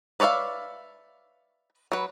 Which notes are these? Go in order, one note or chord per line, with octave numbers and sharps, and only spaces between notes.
B4 C#5 D5 E5 F5
F#3 B4